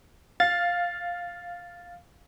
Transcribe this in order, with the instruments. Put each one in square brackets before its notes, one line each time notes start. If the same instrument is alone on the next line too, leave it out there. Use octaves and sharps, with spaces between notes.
[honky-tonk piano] F5 [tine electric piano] A6